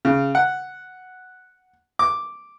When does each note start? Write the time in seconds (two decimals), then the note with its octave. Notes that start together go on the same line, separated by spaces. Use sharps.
0.05 C#3
0.35 F#5
1.99 D6